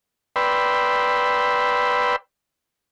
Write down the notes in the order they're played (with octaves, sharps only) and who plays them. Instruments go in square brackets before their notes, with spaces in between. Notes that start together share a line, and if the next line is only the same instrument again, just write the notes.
[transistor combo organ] B4 D5 G5 B5 C6 E6